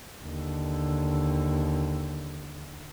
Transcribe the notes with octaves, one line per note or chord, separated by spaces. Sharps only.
D#2 D3